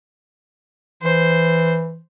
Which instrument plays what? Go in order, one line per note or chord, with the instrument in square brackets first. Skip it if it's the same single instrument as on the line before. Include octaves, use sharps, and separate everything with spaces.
[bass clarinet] E3 [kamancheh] C5